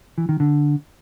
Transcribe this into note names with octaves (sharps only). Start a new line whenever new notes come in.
E3
D#3
D3